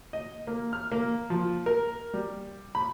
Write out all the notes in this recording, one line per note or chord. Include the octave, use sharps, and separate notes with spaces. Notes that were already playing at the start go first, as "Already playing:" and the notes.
D#5
A#3
F6
A#3
F3
A#4
G3
B5